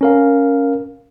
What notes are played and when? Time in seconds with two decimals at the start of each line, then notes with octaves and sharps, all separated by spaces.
0.01 C#4 A#4 F5